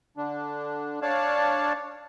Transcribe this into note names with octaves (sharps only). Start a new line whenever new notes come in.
D3 D4
D4 C#5 D5 F5 A5